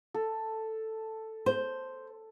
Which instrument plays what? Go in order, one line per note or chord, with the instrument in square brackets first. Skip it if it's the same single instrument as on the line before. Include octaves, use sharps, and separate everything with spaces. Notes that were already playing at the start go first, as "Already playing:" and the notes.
[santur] A4
[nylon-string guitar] C5